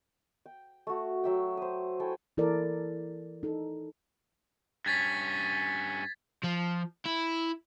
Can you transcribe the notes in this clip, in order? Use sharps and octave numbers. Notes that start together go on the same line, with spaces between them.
G5
A3 F#4
F#3 E5 G5
C5 D#6
E4 A4 G5 G#5
E3 E4 A4 A#4 D5
D#4 A4
G2 C#4 G#6 A6 B6
F3
E4